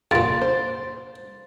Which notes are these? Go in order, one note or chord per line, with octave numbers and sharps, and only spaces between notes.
G2 A#2 F5 C6 A6 D7
C5